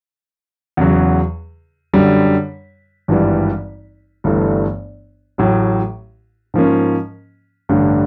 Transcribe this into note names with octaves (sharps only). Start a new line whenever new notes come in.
E2 C#3 F#3
F#2 D3 G3
G#1 G2 E3 G3
G1 G2 E3 A3
A1 A2 F#3
G#2 F3 A#3 C#4
A1 G2 D3